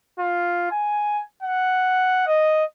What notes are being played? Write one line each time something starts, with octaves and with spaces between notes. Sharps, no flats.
F4
G#5
F#5
D#5